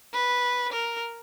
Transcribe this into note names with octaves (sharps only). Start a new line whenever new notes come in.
B4
A#4